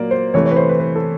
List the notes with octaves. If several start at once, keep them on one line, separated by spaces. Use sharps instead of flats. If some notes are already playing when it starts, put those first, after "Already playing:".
Already playing: A#2 F#3 A#3 A#4 D5
C5
C3 E3 A3 C#5
C#5
B4
C5
B4
B4
A4